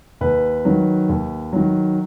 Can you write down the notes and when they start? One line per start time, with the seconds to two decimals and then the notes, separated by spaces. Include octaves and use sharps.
0.21 D#2 B4
0.65 D#3 F#3
1.09 D#2
1.53 D#3 F#3